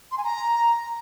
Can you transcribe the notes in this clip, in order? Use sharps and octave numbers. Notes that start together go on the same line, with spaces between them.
C6
G#5
A#5